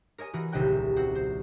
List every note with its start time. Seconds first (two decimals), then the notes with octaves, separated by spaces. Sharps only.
0.18 A#4 C#5 D#5 G#5
0.34 E3 F#4 A#4
0.52 D#1 C2 C#3 D#5 G5 F#6
0.96 C4 F#4
1.15 C5